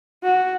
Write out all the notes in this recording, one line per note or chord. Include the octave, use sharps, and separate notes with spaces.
F#4